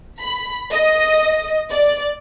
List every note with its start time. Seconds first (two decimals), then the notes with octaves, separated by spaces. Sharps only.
0.21 B5
0.72 D#5
1.71 D5